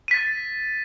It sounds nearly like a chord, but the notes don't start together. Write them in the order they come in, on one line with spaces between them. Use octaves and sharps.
D#7 B6 A6